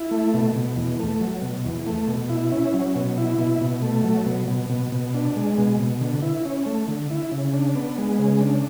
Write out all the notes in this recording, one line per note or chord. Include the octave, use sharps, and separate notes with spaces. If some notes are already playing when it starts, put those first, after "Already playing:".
Already playing: E4
A3
B2
B2
E2
A3
F#3
B2
E2
A3
B2
E4
C#4
F#3
B2
E4
B2
B2
A3
F#3
B2
B2
B2
B2
D4
G#3
B2
B2
D3
E4
C#4
A3
D3
E4
C#3
D4
B3
G#3
C#3
D4